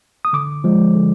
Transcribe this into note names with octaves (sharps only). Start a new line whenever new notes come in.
D#6
D3 D6
F3 G#3
D3